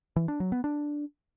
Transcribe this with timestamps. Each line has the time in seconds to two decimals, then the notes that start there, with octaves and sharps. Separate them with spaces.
0.16 E3
0.28 D4
0.40 F#3
0.52 B3
0.64 D4